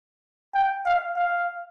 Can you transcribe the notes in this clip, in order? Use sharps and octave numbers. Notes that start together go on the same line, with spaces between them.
G5
F5
F5